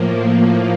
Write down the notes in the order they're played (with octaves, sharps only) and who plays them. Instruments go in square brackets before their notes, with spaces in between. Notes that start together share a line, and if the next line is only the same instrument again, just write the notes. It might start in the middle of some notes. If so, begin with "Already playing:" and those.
Already playing: [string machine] A2 F3 A#3